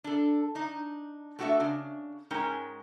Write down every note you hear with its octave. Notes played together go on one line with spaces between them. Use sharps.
D4 A4
D4 D#4
A3 D4 F#4 G4 A4 E5
C#3 D4
G#2 G#3 C#4 A#4 G5 G#5